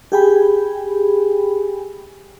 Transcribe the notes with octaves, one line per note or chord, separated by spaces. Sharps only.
G4 G#4 G5 G#5 B5